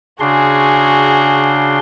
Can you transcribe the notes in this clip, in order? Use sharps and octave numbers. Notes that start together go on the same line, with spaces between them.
C#3 D4 F#4 G#4 C6